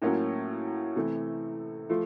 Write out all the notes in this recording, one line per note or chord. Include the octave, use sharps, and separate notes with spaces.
A2 F#3 A#3 C#4 F4
C3 E3 A3
F3 A3